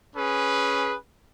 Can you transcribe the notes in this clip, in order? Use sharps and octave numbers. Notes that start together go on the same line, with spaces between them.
C#4 G#4 B4